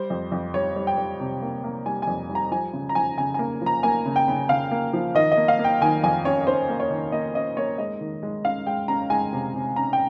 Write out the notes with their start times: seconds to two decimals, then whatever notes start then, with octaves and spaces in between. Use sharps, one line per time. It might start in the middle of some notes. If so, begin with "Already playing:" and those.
Already playing: G3 C5
0.10 F2
0.32 F2
0.54 G3 C#5
0.76 G3
0.87 G5
0.98 G3
1.20 C3
1.42 A#3
1.64 A#3
1.86 G3 G#5
2.02 G#5
2.07 F2
2.29 G3
2.35 A#5
2.51 F3 G#5
2.73 C#3
2.89 A#5
2.95 F3 G#5
3.18 C#3 G#5
3.34 A#3 G#5
3.62 F3 A#5
3.83 A#3 G#5
4.06 C#3
4.16 G5
4.28 C#3
4.49 C#3 F5
4.71 A#3
4.93 F3
5.15 D#3 D#5
5.32 D#5
5.37 A#3
5.48 F5
5.59 A#3
5.64 G5
5.81 D#3 G#5
6.03 F2 G#5
6.25 C#4 C#5
6.47 C#4 C5
6.69 A#3
6.80 C#5
6.91 D#3
7.12 A#3 D#5
7.35 C#4 D#5
7.57 A#3 C#5
7.78 G#3 D#5
8.01 D#3
8.23 G#3
8.44 C#4 F5
8.67 G#3 G5
8.88 C#4 A#5
9.10 G#3 G#5
9.33 C3
9.54 C3
9.76 C#4 A#5
9.93 G5